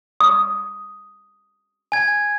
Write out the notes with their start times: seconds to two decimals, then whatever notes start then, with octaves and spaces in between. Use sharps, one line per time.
0.20 D#6
1.92 G#5 G#6